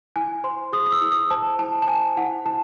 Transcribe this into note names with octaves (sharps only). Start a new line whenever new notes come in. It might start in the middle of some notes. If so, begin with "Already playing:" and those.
E4 G#5
C5 C6
G#4 D#6
D#6
E6
E4
D#6
C5 A5
E4 A5
A5
C5 G#5
E4 F#5
E4 A5